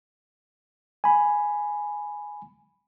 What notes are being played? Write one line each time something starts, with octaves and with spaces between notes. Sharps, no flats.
G#5 B5